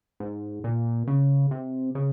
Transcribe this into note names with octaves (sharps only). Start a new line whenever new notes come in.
G#2
A#2
C#3
C3
C#3